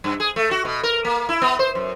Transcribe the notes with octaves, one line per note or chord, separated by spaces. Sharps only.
G2
G#4
A3
F#4
B2
A#4
A#3
E4
B3
C5
F#2